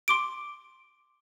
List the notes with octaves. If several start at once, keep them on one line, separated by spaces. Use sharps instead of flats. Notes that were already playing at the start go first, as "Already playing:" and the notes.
C6 D6 D7